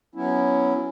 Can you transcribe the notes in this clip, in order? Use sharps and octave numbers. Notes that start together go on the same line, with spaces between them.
F#3 B3 C#4 E4